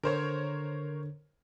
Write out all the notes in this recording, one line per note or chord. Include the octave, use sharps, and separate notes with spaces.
D3 A#4 C5 C#5